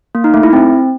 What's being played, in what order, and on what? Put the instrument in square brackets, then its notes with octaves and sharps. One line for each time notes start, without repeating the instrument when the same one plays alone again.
[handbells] A#3
D#4
A3
E4
C4